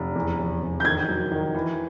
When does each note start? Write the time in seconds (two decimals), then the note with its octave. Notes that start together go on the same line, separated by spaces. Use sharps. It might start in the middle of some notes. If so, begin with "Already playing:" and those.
Already playing: F1
0.15 E2
0.39 F1
0.61 F1
0.80 G6
0.84 D#3 G#6
1.09 F#3
1.32 D#3
1.55 E3